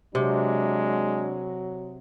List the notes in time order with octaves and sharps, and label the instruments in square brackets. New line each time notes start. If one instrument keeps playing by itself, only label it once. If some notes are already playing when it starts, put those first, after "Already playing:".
[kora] C3 [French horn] F#3 [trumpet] G#3 [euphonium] D4